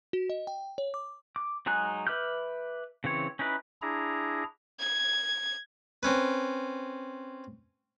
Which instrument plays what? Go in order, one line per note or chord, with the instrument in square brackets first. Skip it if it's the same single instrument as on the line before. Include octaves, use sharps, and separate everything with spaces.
[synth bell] F#4
D#5
G5
C#5
D6
[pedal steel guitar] D6
F#3 G#3 D#4 G#5 F#6
B4 E5 D6 F6 G6
C#3 E3 C4 C#5
C#4 D#4 E4 B4
[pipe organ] D4 E4 G#4 A#5
[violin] G#6
[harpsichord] C4 C#4 B4